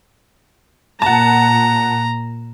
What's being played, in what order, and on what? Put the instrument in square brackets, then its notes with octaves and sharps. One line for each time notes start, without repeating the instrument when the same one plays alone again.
[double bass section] A#2 [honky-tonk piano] F#5 A5 [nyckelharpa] A#5